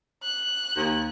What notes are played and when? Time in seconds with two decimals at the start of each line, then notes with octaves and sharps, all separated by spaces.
0.23 F#6
0.76 D#2